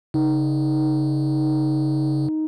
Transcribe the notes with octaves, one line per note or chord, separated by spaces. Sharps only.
C#3 D#4